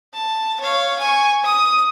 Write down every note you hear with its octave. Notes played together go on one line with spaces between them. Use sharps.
A5
C#5 F5
G#5 C#6
D#6